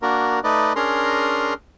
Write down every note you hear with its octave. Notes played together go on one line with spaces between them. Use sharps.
A#3 D4 F#4 A#4
A3 D#4 B4 D5 D#5
C#4 D4 G#4 A#4 A#5 C6